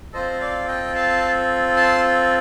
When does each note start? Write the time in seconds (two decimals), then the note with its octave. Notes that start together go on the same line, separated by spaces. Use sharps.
0.13 C4 F4 A4 C5 D#5
0.40 D5 F5
0.68 D#5 G5
0.95 F5 A5
1.76 A5 C6